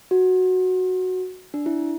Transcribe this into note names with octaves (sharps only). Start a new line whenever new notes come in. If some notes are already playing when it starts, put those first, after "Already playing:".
F#4
D4
E4